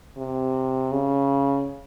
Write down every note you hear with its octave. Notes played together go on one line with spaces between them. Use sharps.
C3
C#3